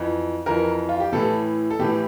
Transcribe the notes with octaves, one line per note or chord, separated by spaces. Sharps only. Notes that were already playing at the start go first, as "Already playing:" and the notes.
Already playing: F2 E3
F2 E3 A#4
F4
G4
A2 E3 A4
A4
A2 E3 G4